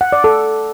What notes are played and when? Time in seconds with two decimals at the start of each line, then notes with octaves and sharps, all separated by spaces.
0.01 F#5
0.12 D5
0.24 A4